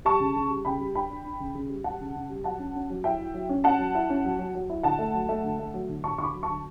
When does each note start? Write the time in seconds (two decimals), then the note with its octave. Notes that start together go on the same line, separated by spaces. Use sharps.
0.05 G3 A5 C#6
0.20 C#3
0.36 C#3
0.50 G3
0.65 C#3 G5 B5
0.80 G3
0.95 D4 G5 B5
1.10 D4
1.25 D4
1.40 C#3
1.55 C#3
1.69 G3
1.84 G3 F#5 A5
2.01 C#3
2.15 C#3
2.30 G3
2.44 F#3 F#5 A5
2.59 C#4
2.75 C#4
2.90 F#3
3.04 E4 E5 G5
3.19 E4
3.34 F#3
3.49 C#4
3.64 C#4 F#5 A5
3.79 F#3
3.95 E4
4.10 C#4
4.25 F#3
4.39 F#3
4.55 F#3
4.70 E4
4.83 D3 F#5 A5
4.99 A3
5.14 F#3
5.29 A3
5.44 D3
5.59 A3
5.74 F#3
5.89 D3
6.04 D3 A5 C#6
6.18 D3 C#6
6.23 B5 D6
6.34 F#3
6.43 A5 C#6
6.48 D3